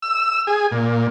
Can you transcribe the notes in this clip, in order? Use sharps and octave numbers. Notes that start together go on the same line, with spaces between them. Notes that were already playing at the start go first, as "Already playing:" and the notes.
E6
G#4
A#2